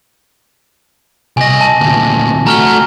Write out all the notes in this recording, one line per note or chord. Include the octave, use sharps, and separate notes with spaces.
C2 D#5 G#5 A#6
A5
D2 A#2
A3 F#4 A#5 F6 G7